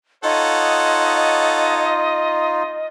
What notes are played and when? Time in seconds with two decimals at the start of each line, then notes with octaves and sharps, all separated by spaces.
0.24 D#4 F4 A4 C#5 D#5 F#5